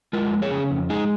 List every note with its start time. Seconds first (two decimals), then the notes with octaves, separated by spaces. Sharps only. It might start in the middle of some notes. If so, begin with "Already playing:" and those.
0.13 G#3 F4 A#4
0.32 F2
0.42 G#4 C#5
0.52 C#3
0.71 F2
0.90 G#3 D#4 G#4